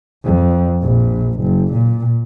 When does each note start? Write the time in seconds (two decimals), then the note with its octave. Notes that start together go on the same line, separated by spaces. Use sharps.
0.24 F2
0.82 A#1
1.41 F#1
1.74 A#2